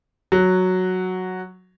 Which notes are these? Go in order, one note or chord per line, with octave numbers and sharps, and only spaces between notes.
F#3